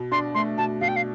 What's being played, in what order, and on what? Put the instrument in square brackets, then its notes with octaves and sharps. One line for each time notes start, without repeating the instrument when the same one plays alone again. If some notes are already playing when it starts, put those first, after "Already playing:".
Already playing: [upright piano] B2
[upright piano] D4 [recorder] C6
[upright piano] A3 [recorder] C6
[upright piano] B2 [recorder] A5
[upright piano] B2 [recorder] F5
[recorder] G5
F5